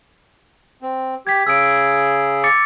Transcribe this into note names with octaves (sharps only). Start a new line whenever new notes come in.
C4
G4 G#6 B6
C#3 G#4 E6 G#6 D7
D6 A6 C#7